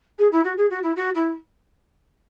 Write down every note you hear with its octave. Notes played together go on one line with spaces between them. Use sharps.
G#4
E4
F#4
G#4
F#4
E4
F#4
E4